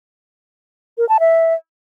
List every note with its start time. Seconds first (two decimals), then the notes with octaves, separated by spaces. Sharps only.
0.98 A#4
1.09 A5
1.20 E5